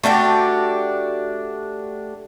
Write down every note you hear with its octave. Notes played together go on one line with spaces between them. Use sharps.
A3 D4 F#4 G4